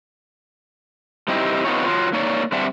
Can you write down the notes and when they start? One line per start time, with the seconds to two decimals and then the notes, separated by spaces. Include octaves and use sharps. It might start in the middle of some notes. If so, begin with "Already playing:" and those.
1.28 G3 C4 D#4 E4 G4
1.65 B3 C4 D#4 F4 G4 C#5
1.85 F#3 F4
2.13 A#3 D#4 C#5 D5
2.52 G3 C4 D4 D5 E5 F#5